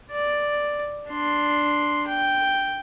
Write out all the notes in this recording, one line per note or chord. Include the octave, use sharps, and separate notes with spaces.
D5
D4 C6
G5